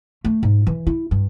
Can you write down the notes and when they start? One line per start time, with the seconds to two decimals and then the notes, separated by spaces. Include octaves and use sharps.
0.25 A3
0.43 G#2
0.67 E3
0.87 E4
1.11 G2